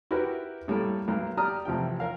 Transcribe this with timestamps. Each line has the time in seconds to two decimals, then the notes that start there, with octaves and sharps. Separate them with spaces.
0.11 E4 F#4 G4 A#4 B4
0.68 A2 G3 A#3 A4
1.07 B1 A#3 B5
1.37 G4 D5 A#5 D#6 F6
1.65 A1 C3 F3 G5
2.00 A#4 F5